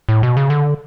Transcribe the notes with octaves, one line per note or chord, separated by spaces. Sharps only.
A2
B2
C#3
D3